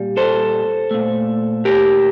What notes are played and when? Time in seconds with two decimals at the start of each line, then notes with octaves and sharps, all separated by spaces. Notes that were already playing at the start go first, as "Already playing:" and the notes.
Already playing: A#2 G3
0.17 A4 C5
0.91 A#2 A3
1.65 G4 A#4